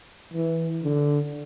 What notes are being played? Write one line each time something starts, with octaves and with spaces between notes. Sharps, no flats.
E3
D3